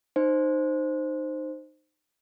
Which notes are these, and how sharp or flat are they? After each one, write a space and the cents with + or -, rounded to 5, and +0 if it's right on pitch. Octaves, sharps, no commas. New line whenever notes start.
D#4 -20 C5 +0